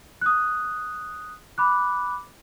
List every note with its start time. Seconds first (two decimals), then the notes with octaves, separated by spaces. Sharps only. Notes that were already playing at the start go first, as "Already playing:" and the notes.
0.21 D#6 F#6
1.58 B5 D6 F#6